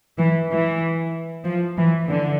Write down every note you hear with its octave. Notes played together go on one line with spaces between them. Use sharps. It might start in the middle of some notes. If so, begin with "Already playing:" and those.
E3
E3
F3
E3
D3